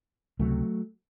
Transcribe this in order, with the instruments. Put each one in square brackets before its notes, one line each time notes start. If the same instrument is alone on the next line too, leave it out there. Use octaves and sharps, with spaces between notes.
[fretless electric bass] C#2 C3 F#3 A3